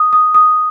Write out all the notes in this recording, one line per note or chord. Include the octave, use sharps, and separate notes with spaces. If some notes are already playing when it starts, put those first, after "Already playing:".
Already playing: D#6
D#6
D#6